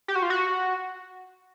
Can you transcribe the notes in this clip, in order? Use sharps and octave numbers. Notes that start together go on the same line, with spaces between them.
G4
F#4
F4
F#4